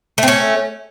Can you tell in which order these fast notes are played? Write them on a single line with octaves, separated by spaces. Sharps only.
A3 C4 C#4